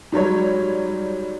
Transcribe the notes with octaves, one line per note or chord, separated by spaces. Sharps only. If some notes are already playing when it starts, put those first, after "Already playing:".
G#2 F#3 G3 C#5